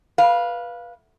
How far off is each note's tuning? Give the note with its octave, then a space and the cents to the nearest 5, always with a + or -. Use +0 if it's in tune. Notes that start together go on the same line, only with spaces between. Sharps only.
B4 -20 F5 +0